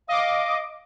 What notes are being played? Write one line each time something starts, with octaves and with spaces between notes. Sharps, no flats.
D#5 F5 D6